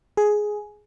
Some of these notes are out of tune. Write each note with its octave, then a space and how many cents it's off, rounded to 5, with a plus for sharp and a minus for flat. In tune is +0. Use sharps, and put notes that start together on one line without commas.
G#4 +10